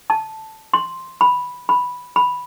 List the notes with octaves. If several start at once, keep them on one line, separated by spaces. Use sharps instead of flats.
A5
C6
B5
B5
B5